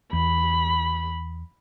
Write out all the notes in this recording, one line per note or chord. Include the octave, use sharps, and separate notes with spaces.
E2 B5